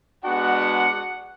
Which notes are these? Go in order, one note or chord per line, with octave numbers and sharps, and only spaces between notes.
G#3 B3 D4 F#4 F#5